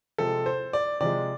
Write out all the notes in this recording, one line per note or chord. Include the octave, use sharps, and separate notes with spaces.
C3 F3 G#3 A4
C5
D5
C3 F3 G#3 D5